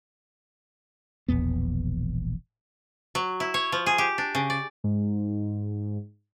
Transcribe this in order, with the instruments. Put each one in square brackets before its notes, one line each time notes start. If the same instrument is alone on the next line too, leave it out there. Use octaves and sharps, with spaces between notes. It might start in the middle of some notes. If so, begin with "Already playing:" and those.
[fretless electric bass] E1 A#1 E2 B3
[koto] F#3
E4
C#5
F3
G#4
G4
D4
C#3
D5
[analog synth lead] G#2